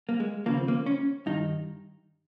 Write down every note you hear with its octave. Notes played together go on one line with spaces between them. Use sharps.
A#3
G#3
D#2 C#3 F3 A#3
C4
A#3
C#4
G2 D#3 D#4